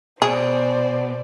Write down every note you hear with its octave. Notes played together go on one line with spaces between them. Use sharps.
B2 G#4 C5 D5